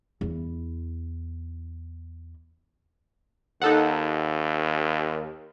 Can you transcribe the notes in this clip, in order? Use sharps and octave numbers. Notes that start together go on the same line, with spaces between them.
E2 E4
D#2 D#4 A4 F#5